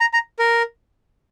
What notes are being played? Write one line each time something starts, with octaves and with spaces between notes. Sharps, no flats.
A#5
A#5
A#4